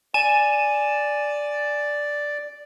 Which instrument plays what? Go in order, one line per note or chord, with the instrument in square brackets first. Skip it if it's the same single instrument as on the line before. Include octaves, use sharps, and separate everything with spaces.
[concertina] D5 [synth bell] G#5 D#7 E7